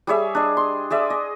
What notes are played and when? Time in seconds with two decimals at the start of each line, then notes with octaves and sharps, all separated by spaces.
0.07 G3 G#4 C#5 E5
0.35 D4 D#5
0.57 C6
0.90 G#4 D5 E5
1.10 D#5